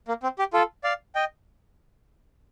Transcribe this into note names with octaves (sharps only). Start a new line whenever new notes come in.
A#3
C4
G4
F4 A4
D5 F5
D#5 G5